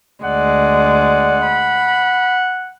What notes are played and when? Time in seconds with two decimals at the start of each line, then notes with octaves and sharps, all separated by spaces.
0.23 D2 G#3 D5 F#5
1.43 B5